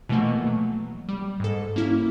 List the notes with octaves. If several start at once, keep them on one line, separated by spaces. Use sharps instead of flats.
B2 E3 F3 A3 A#3
F#3
G3
G#2 A4
A#3 C#4 E4